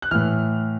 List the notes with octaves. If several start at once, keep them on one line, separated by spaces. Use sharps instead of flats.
F#6
A2 E3 F6